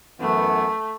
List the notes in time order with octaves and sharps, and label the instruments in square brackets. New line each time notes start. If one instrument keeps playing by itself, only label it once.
[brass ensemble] F#2 E3 B3 [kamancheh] A3